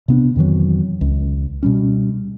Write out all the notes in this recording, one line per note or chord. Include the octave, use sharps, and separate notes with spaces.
C3 B3 D4
F2 D#3 E3 F#3
C#2
B2 G3 C#4